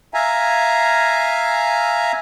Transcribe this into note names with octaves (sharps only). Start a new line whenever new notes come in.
E5 F5 G#5 A#5